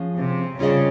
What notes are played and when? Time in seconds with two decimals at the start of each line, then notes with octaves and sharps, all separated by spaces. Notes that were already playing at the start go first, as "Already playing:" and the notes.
Already playing: F3 G#3 C#4
0.16 C3
0.58 C#3 G3 C#4 F4 G#4 D#5